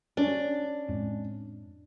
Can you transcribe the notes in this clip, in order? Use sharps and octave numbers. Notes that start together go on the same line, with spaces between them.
C#4 D4
F2 A2 G#3